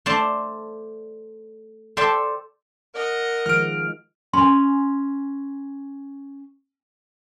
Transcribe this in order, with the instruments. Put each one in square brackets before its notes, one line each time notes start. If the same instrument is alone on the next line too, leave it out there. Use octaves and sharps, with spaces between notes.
[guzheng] A3 C5 D5 A5
A4 C5 D5 E5 G5 A5
[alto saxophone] A#4 [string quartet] D#5 F#5
[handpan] D#3 F3 G#3 [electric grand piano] F6 D7
[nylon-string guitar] C#4 G#5 [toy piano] C6